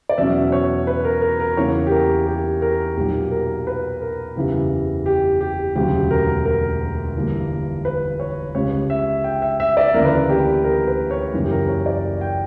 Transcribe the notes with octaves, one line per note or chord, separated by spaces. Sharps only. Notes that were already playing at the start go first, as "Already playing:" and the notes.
D5
E2 B2 F#3 C#4 E5
C#5
B4
A#4
A#4
A#4
E2 C#3 E3 A#3 C#5
G4
A#4
G4
A#4
B1 A#2 F#3 A#3 G4
A#4
B4
A#4
F#1 E2 C#3 E3 G3
G4
G4
E1 D2 C#3 F#3 G4
A#4
A#4
G1 G2 E3 G3 A#3
B4
C#5
C#2 C#3 G3 C#5
E5
G5
E5
E5
D5
D2 C#3 E3 A#3 A#4
B4
A#4
G4
A#4
B4
C#5
F#1 F#2 E3 A#3
G4
A#4
C#5
D5
G5